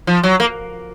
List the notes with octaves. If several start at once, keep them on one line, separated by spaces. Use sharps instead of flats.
F3
F#3
A#3